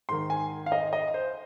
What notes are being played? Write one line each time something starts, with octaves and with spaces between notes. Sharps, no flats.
G#2 D#3 C6
G#5
F5
D#5
D#5
C5